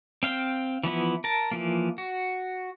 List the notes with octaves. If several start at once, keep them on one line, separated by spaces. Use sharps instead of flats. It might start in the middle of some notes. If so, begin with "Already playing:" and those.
C4 F5 G5
E3 F3 B3 E4
A#4 A5
E3 F3 A#3
F#4